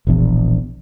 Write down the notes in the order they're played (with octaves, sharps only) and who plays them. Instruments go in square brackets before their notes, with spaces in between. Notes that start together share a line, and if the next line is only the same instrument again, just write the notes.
[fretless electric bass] E1 A#1 E2